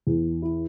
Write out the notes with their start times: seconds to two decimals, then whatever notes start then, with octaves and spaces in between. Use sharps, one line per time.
0.07 E2
0.42 E4